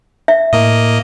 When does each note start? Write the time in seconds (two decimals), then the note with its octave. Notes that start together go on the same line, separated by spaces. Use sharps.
0.28 E5
0.53 A2 A#3 D#5